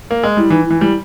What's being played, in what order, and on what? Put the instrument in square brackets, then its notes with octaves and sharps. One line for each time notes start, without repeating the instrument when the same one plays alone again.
[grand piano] A#3
G#3
[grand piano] G3 [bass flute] E4
[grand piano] E3 [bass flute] D#4
[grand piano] E3 [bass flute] E4
[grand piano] G3 [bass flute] E4